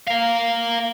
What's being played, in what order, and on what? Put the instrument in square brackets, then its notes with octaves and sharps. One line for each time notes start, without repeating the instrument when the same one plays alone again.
[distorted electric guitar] A#4 F5